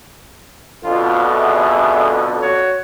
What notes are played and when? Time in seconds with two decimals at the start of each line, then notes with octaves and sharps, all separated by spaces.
0.85 F2 B2 D3 F4
1.29 G#4 E5
2.40 F#4 C#5